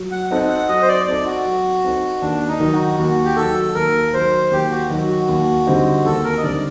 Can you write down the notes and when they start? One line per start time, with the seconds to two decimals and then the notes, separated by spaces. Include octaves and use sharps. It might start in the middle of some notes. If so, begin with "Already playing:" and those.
Already playing: F#3
0.11 F#5
0.31 C4 D#4 A4 F#5
0.49 F#5
0.69 F#3 D#5
0.82 C5
0.88 D5
1.07 C4 D#4 A4 D5
1.26 F#4
1.45 F#3
1.84 C4 D#4 A4
2.22 D#2 D4
2.48 D#4
2.60 D#3 F#3
2.73 F#4
2.99 D#2 F#4
3.25 G4
3.36 D#3 F#3 A4
3.75 D#2 A#4
4.13 D#3 F#3 C5
4.51 D#2 G4
4.71 F#4
4.90 D#3 F#3 F#4
5.09 F#4
5.29 D#2
5.66 D3 G3 C4 D#4
6.05 D#2 A4
6.24 A#4
6.38 D#5
6.43 D3 G3 C4 D#4 D5